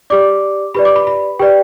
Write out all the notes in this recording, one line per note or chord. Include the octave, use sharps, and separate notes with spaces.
G4 D5 D6
G4 B4 D5 B5
D6
B5
B5
G4 B4 D5 G5